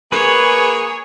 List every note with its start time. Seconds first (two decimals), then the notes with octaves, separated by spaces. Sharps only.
0.12 A#3 G#4 B4 C#5